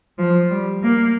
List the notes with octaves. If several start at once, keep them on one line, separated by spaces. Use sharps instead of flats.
F3
G3
A#3